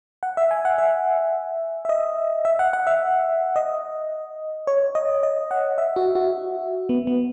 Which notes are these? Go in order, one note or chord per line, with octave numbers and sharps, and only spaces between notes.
F#5
E5
G#5
F#5
E5
E5
D#5
E5
F#5
F#5
E5
D#5
C#5
D#5
D#5
F#5
E5
F#4
F#4
B3
B3